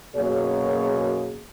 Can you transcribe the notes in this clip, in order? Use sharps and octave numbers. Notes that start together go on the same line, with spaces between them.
F#2 B2 A#3 G#4 C#5